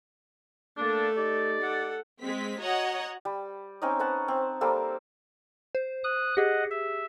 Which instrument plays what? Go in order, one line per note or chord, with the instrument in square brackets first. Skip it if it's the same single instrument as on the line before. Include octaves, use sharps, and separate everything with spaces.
[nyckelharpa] A3 A4 [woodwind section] A#3 D4
[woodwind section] D#4 G4 D5
[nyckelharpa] A4 F#5
[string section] G#3 C4 B6
F#4 C#5 D#5 F#5 A#5
[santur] G3
C4 C#4 D#4 D#5
B4 C#5 F#5 A5
C4
G3 A#3 C4 A4
[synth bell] C5
[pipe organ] D#6 F#6
[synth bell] G4 G#4 [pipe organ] D#5 F#5
[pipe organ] E5